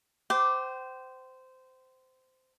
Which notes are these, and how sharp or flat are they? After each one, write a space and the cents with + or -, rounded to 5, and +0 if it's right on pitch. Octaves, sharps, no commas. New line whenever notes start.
C5 -15 G5 -35 D6 +0